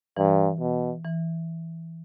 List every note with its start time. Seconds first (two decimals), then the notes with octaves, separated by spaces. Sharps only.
0.17 G2 E3
0.60 B2
1.04 E3